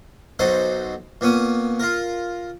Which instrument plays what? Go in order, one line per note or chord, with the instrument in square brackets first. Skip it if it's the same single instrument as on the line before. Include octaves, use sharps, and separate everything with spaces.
[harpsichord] B1 F#3 D#4 A4 C5
A#2 B3 C#4 D#6
F4 A#4